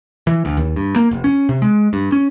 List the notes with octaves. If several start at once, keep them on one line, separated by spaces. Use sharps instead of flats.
E3
D2
D#2
G2
A#3
F1
C#4
C3
G#3
G2
C#4